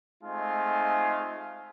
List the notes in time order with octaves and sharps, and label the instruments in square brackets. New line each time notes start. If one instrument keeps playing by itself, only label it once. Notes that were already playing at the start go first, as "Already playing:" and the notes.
[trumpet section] G#3 A3 C4 D#4 F4 G#5